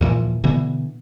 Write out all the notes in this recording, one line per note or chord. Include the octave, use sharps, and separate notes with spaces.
D#2 A#2 E3 F3
B2 D3 E3 B3